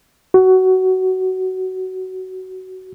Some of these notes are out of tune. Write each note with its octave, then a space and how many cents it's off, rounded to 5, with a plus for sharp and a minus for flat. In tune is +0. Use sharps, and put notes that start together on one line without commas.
F#4 +15